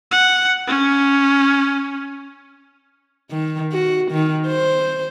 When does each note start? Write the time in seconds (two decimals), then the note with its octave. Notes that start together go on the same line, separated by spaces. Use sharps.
0.11 F#5
0.68 C#4
3.31 D#3
3.72 F#4
4.11 D#3
4.47 C5